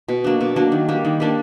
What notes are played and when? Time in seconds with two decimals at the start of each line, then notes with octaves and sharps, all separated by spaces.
0.08 B2
0.24 F#3 A#3 D4
0.41 B2
0.56 F#3 A#3 D4
0.72 D#3
0.89 G3 A#3 D4
1.05 D#3
1.20 G3 A#3 D4